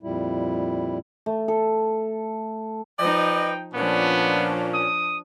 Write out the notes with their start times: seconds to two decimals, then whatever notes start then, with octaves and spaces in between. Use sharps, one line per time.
0.03 F2 A#2 G3 E4
1.26 A3
1.48 A4
3.00 F3 D#4 B4 D5 D#5 G5
3.74 A#2 F3 B3 C#4 D4
4.74 D#6